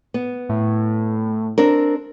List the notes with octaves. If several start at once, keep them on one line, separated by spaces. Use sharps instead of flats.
B3
A2
C4 D4 A#4